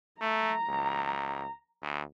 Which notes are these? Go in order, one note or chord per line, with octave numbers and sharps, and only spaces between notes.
A3 A#5
C#2
D2